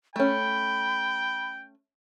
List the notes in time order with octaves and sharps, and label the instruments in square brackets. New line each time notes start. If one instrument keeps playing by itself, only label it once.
[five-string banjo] A3 C#4 [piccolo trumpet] G5 [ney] B5